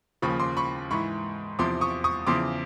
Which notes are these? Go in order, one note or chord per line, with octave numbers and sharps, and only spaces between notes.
D#2 C#3 F3 B5 C#6
C6 D6
B5 C#6
G#2 E3 B5 C#6
E2 C3 F3 C6 D6
C#6 D#6
C#6 D#6
E2 C#3 F3 C6 D6